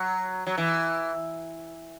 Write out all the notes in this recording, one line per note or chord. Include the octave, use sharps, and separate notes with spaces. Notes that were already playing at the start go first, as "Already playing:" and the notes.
Already playing: F#3
F#3
E3